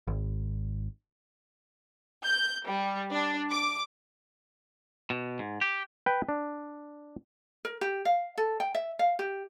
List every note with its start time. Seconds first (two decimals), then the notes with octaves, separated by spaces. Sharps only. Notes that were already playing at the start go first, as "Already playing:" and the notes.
0.07 G#1
2.25 G6
2.66 G3
3.11 D4
3.51 D6
5.10 B2
5.39 G#2
5.61 G4
6.06 B4 G5
6.29 D4
7.65 A#4
7.81 G4
8.05 F5
8.38 A4
8.60 G5
8.75 E5
8.99 F5
9.19 G4